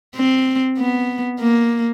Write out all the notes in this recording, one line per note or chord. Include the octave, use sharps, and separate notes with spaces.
C4
B3
A#3